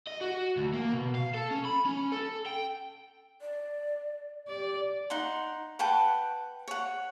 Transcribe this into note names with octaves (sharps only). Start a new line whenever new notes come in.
D#5
F#4
D2
A#3
B2
F5
A4
C#4
B5
C#4
A4
G5
D5
G4 D5
D#4 F#5 C6
B4 F#5 G5 A5
C#5 F#5